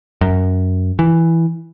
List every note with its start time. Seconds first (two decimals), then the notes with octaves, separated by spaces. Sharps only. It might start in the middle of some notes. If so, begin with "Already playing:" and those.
0.21 F#2
0.99 E3